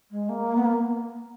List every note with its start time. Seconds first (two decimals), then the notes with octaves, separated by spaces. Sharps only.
0.10 G#3
0.29 A#3
0.56 B3
0.65 A#3